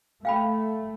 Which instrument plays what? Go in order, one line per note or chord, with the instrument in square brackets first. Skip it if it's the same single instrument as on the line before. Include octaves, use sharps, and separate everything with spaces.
[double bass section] A3 [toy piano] F5 G5 B5